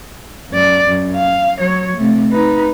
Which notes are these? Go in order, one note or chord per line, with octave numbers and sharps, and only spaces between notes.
F#2 D5
F#2
F5
F#3 C#5
C3 A3
D#4 B4